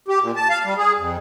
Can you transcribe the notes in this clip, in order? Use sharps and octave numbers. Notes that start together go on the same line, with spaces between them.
G4
A#2
A5
F5
G3
G#4
F2